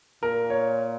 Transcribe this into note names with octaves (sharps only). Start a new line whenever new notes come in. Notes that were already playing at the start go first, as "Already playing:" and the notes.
A#2 A#4
C#5